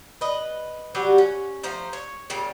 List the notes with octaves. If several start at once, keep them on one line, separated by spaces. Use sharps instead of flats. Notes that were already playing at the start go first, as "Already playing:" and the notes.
B4 D#5
F#3 G3 F#4 G4
C#4
F3 A3 C5 A#5
C#5
A#2 C#3 G3 C#4